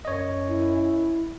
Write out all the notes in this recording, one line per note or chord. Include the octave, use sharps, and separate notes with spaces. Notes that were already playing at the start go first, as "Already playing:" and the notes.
F#2 C#5 D#5
E4